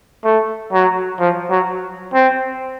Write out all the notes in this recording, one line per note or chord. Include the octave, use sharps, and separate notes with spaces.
A3
F#3
F3
F#3
C4